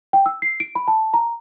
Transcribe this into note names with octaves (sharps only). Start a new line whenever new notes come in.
G5
E6
C7
D7
B5
A5
A#5